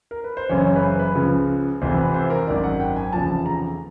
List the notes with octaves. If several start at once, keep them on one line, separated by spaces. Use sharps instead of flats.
A#4
B4
C5
F#1 F#2 C#3 E3 C#5
C#5
B4
C5
B4
C#2 C#3 F3
F1 F2 C3 E3 C5
B4
C5
A#4
G#1 F#2 D#3 D5
F#5
G5
G#5
G#5
F1 E2 C#3 F3 A5
A#5